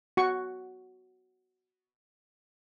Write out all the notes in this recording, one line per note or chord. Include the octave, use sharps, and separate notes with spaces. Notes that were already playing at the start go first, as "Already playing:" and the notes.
F#4 C#6